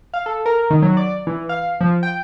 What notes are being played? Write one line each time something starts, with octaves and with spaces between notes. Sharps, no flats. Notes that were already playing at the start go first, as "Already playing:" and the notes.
F5
A4
A#4
D#3
F#3
D5
E3
F5
F3
G5